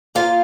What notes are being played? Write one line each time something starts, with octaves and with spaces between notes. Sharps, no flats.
A#3 F4 F5